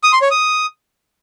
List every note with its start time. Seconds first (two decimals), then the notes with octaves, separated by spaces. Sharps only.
0.03 D#6
0.13 C6
0.22 C#5
0.31 D#6